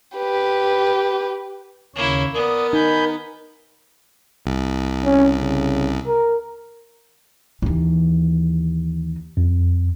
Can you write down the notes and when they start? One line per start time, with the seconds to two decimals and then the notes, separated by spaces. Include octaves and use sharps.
0.17 G4 B4
1.96 D#2 C#3 A#3 E4 C#5
2.34 B3 A#4 D5 D#6
2.73 D#4 G#5 B5 G6
4.46 C2
5.05 C#4
5.39 C#3
6.07 A#4
7.62 D#2 E3
9.37 F2